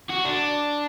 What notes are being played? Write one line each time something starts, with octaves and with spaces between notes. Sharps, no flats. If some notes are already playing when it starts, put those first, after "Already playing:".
F#4
D4